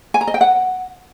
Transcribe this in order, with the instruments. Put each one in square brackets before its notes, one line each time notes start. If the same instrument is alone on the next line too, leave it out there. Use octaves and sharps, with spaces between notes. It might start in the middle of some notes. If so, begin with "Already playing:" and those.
[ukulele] G#5
A#5
D#5
G5
F#5